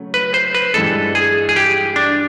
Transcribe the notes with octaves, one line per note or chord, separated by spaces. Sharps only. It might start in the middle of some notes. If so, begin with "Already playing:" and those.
Already playing: C#3 F#3 A3
B4
C5
B4
G2 E3 G#3 A4
G#4
G#4
G4
D4